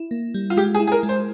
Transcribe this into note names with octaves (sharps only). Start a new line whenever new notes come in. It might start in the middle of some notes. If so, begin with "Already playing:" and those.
Already playing: E4
A#3
G3
F4
G#3 G4
G#4
E4
G#4
A#4
G#3
C5